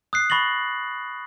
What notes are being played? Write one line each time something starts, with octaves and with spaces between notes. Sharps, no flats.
D#6 F#6 C7
B5 C#6 A6 A#6 F#7